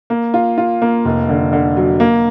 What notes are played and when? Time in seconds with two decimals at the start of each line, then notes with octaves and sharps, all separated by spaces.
0.10 A#3
0.34 F4
0.58 F4
0.82 A#3
1.05 F1
1.29 D3
1.53 D3
1.77 F#3
2.00 A#3